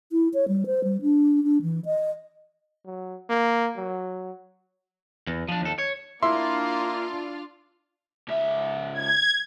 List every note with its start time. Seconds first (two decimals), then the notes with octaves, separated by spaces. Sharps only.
0.12 E4
0.34 C#5
0.48 G3
0.66 C5
0.84 G3
1.02 D4
1.43 D4
1.62 E3
1.85 D#5
2.86 F#3
3.30 A#3
3.77 F#3
5.27 E2
5.48 F3 D4
5.61 D#2 A4
5.78 C#5
6.23 A#3 D4 E4 F4 C6
8.28 C#2 E5
8.94 G#6